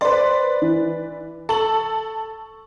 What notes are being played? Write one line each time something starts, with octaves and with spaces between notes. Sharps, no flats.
B4 C5 D5 C6
E3
A4 C#6 F#7